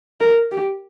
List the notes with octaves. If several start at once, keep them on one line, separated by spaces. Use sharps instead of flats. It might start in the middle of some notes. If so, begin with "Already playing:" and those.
A#4
G4